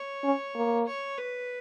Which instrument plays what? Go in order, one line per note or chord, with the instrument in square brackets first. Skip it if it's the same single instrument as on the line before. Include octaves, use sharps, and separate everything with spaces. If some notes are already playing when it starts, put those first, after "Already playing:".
Already playing: [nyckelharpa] C#5
[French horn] C#4
A#3
[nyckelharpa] C#5
B4